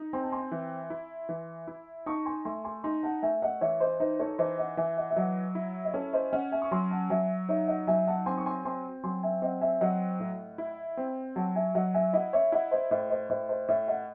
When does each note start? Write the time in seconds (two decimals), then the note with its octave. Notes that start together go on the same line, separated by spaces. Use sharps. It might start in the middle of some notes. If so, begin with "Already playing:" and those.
Already playing: D#4
0.13 C4 G#5 C6
0.23 A5
0.32 G#5 C6
0.52 E3
0.90 E4
1.29 E3
1.68 E4
2.06 D#4 A5 C#6
2.25 G#5 C6
2.45 A3 G#5 C6
2.64 G#5 C6
2.84 D#4 G#5 C6
3.03 F#5 A5
3.22 A3 E5 G#5
3.42 D#5 F#5
3.61 E3 C#5 E5
3.80 C5 D#5
4.00 D#4 C5 D#5
4.19 A4 C#5
4.38 E3 C5 D#5
4.58 D#5 F#5
4.77 E3 E5 G#5
4.97 D#5 F#5
5.10 E5
5.16 F#3 D#5 F#5
5.55 E4
5.85 D#5
5.94 C#4 A4 C#5
6.13 C5 D#5
6.32 C#4 D#5 F#5
6.52 E5 G#5
6.62 C#6
6.71 F#3 G#5 C6
6.90 F#5 A5
7.10 F#3 E5 G#5
7.49 D#4 C#5 E5
7.68 D#5 F#5
7.87 F#3 E5 G#5
8.07 F#5 A5
8.26 C4 G#5 C6
8.37 C#6
8.46 G#5 C6
8.65 C4 G#5 C6
9.04 F#3 G#5 C6
9.23 E5 G#5
9.42 C4 D#5 F#5
9.61 E5 G#5
9.81 F#3 D#5 F#5
10.20 A2
10.58 E4
10.97 C4
11.36 F#3 F#5 A5
11.56 E5 G#5
11.75 F#3 D#5 F#5
11.94 E5 G#5
12.13 E4 D#5 F#5
12.33 C#5 E5
12.52 E4 D#5 F#5
12.71 C5 D#5
12.91 A2 C5 D#5
13.10 C5 D#5
13.30 A2 C5 D#5
13.49 C5 D#5
13.68 A2 C#5 E5
13.88 D#5 F#5